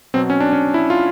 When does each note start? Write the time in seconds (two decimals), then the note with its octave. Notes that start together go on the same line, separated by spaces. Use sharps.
0.14 B2 F#3 C4
0.30 C#4
0.40 D4
0.53 C#4
0.74 E4
0.90 F4